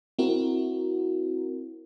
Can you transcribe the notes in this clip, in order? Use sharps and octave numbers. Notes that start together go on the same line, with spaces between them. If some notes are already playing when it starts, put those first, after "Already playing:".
C4 E4 F#4 A#4